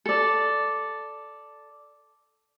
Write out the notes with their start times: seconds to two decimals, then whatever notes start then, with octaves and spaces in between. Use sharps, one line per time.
0.06 A4 D5